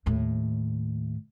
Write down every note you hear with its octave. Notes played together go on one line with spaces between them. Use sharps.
D#2 A2